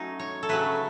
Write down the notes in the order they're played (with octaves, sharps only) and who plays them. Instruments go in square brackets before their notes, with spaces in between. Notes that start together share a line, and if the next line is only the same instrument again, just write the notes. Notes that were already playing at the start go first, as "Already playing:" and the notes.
Already playing: [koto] F#3 A3 C#4 D#4
C#5
A4
C#3 F#3 A3 B4